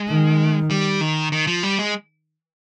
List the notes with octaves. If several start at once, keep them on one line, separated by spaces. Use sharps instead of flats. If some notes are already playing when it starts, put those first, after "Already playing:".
Already playing: G#3
D#3
G3
D#3
D#3
F3
G3
G#3